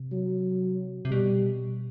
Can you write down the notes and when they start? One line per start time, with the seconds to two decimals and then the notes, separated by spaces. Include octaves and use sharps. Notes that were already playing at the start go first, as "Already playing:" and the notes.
Already playing: C3
0.12 F#3
1.05 C3
1.11 B2 G3